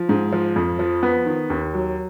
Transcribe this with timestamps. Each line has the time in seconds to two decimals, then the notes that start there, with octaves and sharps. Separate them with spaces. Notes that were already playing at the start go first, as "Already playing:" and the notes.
Already playing: F3
0.09 G#2
0.32 F3
0.56 F2
0.79 F3
1.03 B3
1.26 D#3
1.50 D#2
1.74 F#3